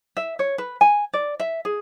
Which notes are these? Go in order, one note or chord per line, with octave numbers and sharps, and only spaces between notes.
E5
C#5
B4
G#5
D5
E5
G#4